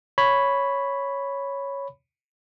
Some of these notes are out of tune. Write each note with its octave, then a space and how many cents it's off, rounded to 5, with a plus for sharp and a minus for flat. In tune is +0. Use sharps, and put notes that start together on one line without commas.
C#5 +0 B5 +0